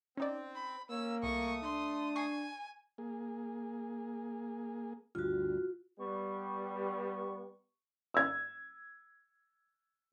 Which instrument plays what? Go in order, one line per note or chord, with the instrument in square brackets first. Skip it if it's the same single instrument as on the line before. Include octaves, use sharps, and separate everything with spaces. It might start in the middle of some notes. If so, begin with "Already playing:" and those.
[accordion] C4 [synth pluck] C#4 D#4 D5
[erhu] B5
[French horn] A#3 [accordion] C#4 [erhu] E6
[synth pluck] C2 [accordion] A3 D#6 [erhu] C#6
[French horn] D4 [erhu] C6
[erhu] G#5 [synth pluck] C#6 C7
[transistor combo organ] A#3 G#4
[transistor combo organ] D2 G2 [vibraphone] F4 F#4
[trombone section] G3 B3 [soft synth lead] C#6
[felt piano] E6 G#6